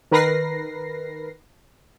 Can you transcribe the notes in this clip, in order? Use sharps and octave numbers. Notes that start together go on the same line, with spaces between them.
D#3 A#4 B4 A#6 C7